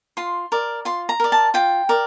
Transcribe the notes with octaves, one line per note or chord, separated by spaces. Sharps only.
F4 C6
A#4 D5
F4 C6
A#5
A#4 D5
A5
F4 G5
A#4 D5